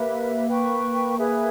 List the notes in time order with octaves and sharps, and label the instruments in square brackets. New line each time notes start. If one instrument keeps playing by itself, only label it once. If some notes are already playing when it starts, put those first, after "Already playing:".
Already playing: [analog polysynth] A#3 [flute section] G4 B4 E5
[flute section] B4 G5 C#6
G#4 B4 E5